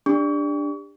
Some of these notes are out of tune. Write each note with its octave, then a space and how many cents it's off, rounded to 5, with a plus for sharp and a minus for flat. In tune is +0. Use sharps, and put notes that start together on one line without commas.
D4 +0 G4 +35 C#6 +35